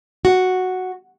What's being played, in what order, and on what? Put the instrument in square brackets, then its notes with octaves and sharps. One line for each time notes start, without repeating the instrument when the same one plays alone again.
[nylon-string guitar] F#4